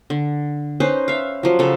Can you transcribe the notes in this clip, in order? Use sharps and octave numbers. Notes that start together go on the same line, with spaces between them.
D3
C#4 D#4 B4 C5
E5 F5
F3 F#3
C#3 A4